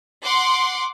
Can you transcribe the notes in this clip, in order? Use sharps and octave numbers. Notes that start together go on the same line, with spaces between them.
F#5 C6 D6